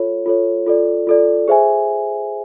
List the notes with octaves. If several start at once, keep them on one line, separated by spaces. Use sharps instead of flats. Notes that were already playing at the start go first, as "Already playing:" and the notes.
Already playing: F4 A4 C#5
F4 A4 C#5
F4 A4 D5
F4 A4 D5
G#4 C5 E5 G#5